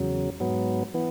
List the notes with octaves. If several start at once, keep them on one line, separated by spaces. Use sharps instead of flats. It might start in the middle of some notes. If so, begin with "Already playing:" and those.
Already playing: E2 C#3 F#3
G#2 F#3 B3
E3 B3